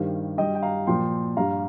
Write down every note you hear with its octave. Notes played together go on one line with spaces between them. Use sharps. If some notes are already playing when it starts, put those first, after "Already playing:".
Already playing: G2 D#3 G3 C5 F5
G2 G3 D#5 G5
G5
F5 A#5
A#2 F3 G5 C6
G2 G3 F5 A#5